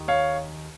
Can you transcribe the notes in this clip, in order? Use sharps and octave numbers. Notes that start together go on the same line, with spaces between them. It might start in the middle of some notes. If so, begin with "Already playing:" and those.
Already playing: D#2 D#3
C#5 F5